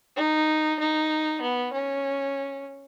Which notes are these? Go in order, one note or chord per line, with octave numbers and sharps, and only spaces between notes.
D#4
D#4
B3
C#4